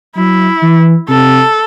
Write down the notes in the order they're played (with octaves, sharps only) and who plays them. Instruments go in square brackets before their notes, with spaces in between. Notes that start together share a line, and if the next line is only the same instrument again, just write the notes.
[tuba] F#3 [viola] E4
[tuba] E3
[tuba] C3 [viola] A4